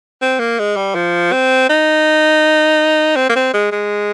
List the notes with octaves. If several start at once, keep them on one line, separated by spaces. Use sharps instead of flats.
C4
A#3
G#3
G3
F3
C4
D#4
C4
A#3
C4
G#3
G#3